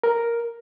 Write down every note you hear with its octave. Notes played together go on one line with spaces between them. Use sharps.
A#4